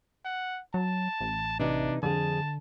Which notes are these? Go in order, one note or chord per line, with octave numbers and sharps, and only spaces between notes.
F#5
F#3 A5
A1
C3 E3 D4 D#4
F2 D3 G#4 A5